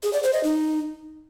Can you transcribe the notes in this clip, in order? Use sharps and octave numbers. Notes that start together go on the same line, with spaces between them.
G#4
D5
C5
D#5
D#4